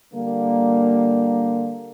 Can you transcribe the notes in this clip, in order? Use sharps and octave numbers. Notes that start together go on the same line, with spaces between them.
D3 G3 A#3